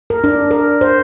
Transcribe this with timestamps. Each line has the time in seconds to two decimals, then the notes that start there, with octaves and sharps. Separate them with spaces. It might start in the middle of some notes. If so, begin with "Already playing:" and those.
0.10 A#4
0.24 D4
0.51 A#4
0.81 C5